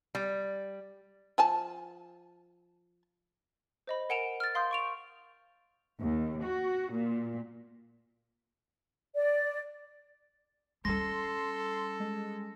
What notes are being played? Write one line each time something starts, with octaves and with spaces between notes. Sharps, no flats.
G3
F3 G#5 A5
C5 D#5 B5
A#4 F#5 G#5 D7 E7 F7
F6 A6
F5 C6 D#6 G6
C#6 D7 F7
D#2
F#4
A#2
D5
G3 C#4 A4 C6 A#6
G#3